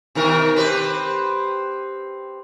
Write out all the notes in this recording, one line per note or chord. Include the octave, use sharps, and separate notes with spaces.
B2 D#3 A#4
C4 G4 B4